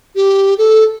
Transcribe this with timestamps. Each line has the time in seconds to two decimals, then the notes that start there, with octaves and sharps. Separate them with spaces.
0.16 G4
0.58 A4